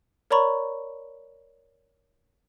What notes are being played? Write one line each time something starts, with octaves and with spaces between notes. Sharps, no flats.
A#4 C#5 D5 A#5 B5 C#6